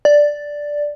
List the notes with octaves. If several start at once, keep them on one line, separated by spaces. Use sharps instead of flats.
D5